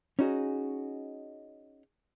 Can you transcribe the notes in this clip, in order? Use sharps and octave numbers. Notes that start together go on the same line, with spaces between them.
C#4 D#4 F#4 G#4